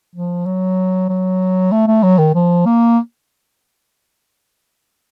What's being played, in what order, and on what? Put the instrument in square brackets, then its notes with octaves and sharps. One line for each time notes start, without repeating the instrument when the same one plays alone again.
[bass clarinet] F3
F#3
F#3
A3
A3
F#3
D#3
F3
A#3